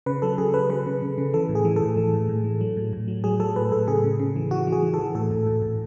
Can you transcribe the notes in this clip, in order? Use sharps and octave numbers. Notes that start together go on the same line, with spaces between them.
C#3 B4
F#3 A4
C#3 G#4
F#3 B4
C#3 B4
C#3
C#3
C#3
E3 A4
A2
G#4
E3
A4
A2
E3
A2
A2
E3
F#3
A2
A2
F#3
F#3 G#4
F#3 A4
A2 B4
A2 A4
C#3 G#4
C#3
C#3
E3
E3 F#4
E3
G#4
E3
A4
E3
A2 A4
A2
A2
A2